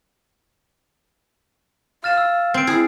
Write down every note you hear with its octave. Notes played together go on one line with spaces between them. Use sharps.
F5 F6 A6 E7
E6
C4 C7 D7
E4 G#4